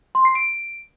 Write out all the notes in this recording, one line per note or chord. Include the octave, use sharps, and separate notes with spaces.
C6
C7
D7